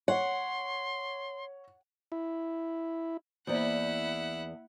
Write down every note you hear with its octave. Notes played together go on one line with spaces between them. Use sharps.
C#5 F#5 C6
E4
E2 A#3 E4 C5 D5 F#5